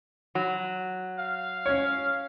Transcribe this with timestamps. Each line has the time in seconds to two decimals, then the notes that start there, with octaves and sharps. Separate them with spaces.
0.35 F#3
1.19 F5
1.66 C#4 C#5